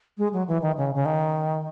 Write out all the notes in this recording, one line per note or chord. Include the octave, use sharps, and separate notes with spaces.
G#3
F#3
E3
D#3
C#3
C#3
D#3